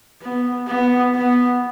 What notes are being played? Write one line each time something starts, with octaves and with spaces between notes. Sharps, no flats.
B3
B3
B3